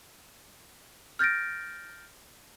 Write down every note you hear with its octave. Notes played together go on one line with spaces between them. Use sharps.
F6 G6 A6 A#6 D7